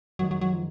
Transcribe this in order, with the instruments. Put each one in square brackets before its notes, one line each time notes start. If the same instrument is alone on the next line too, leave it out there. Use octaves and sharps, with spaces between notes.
[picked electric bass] F#2 D#3 G#3 [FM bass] F#3
[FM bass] F#3
F#3
F3